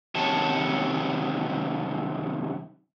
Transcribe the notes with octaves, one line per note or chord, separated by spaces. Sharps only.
F#2 C3 D#3 C#5 A5